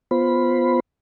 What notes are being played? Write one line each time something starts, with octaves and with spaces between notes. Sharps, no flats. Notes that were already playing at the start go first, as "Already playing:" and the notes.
B3 F4 C5 B5